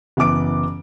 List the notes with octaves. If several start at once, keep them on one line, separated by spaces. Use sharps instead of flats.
F#1 E3 B3 D6 D7